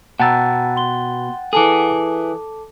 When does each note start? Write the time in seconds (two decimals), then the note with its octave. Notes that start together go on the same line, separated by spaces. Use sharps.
0.19 B2 F#5 G5 A5 A#5 E6 A6
0.76 C6 G7
1.53 E3 G#4 A4 A5 D6